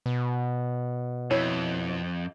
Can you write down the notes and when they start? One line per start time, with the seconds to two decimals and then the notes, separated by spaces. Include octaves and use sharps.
0.06 B2
1.31 F2 E4 C#5